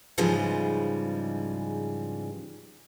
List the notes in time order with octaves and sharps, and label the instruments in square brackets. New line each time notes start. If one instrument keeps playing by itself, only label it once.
[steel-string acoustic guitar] G#2 C#3 E3 F3 G3